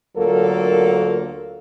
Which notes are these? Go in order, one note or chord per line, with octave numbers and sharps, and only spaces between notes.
D2 F#3 A#3 F4 A4 A#4